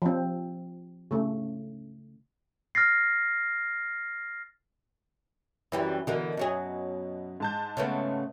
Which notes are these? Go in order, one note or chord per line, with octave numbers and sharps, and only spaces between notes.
F3 C4
C#3 A3
F6 A6 A#6 C7
F#2 E3 G3 E4 G4 D5
B2 D3 E3 A#4
F#2 F#3 G#4
G#2 A5 G6
C#3 A3 B3